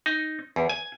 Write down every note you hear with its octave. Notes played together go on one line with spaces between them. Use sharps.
D#4
E2
G#5